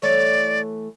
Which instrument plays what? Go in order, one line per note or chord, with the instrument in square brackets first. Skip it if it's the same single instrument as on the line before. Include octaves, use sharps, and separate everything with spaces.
[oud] E3 A3 C#5 [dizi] D5